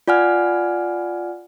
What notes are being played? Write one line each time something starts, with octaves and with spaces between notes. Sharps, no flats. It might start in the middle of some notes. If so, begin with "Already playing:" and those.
F4 D5 F#5 G#5 F6